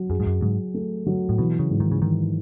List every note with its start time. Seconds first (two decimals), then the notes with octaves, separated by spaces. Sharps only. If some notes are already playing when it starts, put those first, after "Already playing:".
Already playing: F#3
0.10 F#2 G#4
0.20 G#2
0.27 F#2
0.42 G#2 F#3
0.74 A3
1.06 F#3
1.29 A2
1.38 B2 E3
1.59 C#3
1.70 G#2
1.80 D#3
1.92 C#3
2.02 D#3 E3